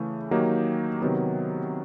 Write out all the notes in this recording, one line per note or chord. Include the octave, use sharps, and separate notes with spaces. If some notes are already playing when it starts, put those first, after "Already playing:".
Already playing: C#3 E3 A3
D#3 F#3 A#3 D#4 G4
C3 D#3 F#3 B3